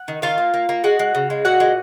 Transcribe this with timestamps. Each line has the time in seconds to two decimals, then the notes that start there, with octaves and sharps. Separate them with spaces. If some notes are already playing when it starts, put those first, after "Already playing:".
Already playing: F#5
0.08 D#3
0.22 D#3 F4 F5
0.38 A#3
0.54 A#3
0.69 A#3
0.84 G#3 F#4 F#5
0.99 G#3
1.15 C#3
1.30 G#3
1.45 A#2 F#4 F#5
1.60 G#3